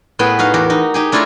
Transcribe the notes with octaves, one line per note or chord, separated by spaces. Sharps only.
A2 B3 G#4 B4 G5
D#4 F#4 F5
E2 F#4 G4 A#4
D#4
D#4 G4 G#4
A3 D4 E4 F4 C#5 A#5